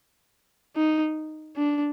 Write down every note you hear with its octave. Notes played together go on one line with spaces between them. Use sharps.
D#4
D4